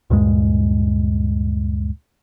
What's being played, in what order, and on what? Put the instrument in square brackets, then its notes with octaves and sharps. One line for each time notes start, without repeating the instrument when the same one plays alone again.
[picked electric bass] D2 G2 A#2 G#3